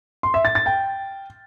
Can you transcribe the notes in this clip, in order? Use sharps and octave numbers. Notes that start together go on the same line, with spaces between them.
C6
E5
A6
A6
G5